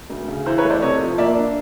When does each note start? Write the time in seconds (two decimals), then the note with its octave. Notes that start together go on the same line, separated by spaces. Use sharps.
0.10 D2
0.28 C#3
0.46 E3 C5
0.58 B4 C#5
0.64 A3
0.70 C5 D5
0.82 C3 C#5 D#5
1.01 F3
1.18 A#3 D5 E5
1.36 D4